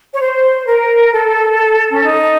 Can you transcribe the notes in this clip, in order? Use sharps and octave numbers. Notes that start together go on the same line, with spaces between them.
C#5
C5
A#4
A4
C#4
D#4